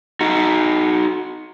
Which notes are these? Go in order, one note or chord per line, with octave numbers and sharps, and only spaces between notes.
D#4 F#4